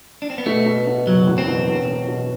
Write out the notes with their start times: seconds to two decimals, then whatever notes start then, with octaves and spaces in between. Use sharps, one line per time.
0.22 D4
0.30 C4
0.38 B3
0.46 B2 A3
0.66 B2
0.87 B2
1.07 F#1 F#3
1.27 E2
1.38 C4
1.48 B2
1.68 E1
1.88 E1
2.08 B2